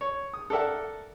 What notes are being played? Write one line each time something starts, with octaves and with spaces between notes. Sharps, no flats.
C#5
D#6
A4 A#4 D5 E5 F#5